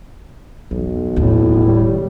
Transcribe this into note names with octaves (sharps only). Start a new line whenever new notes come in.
B1 E2
F1 D#2 A2
G3